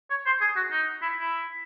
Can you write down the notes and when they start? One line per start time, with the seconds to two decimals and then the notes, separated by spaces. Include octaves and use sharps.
0.10 C#5
0.26 C5
0.41 G#4
0.56 F#4
0.71 D#4
1.02 E4
1.17 E4